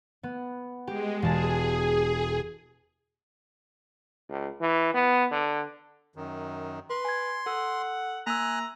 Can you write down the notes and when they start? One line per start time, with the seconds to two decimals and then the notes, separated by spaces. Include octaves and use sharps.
0.23 B3
0.87 G#3 G4
1.22 E1 G#4 A5
4.29 C#2
4.61 E3
4.94 B3
5.31 D3
6.16 F#2 D#3
6.90 B4 C6
7.05 G#5 G#6
7.46 A4 F#5 E6
8.27 A#3 G#5 A#5 E6 F#6